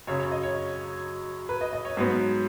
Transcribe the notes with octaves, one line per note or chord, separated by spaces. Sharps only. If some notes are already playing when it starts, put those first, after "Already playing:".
F#2 C#3 F#3 C#5
C#5
D#5
C#5
B4
D#5
D#5
C#5
G#2 F#3 B3